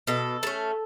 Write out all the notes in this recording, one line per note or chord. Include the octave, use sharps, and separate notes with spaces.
B2 A4
A3 C#4